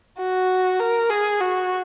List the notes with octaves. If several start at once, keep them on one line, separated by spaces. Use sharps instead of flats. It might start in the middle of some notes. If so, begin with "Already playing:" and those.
F#4
A#4
G#4
F#4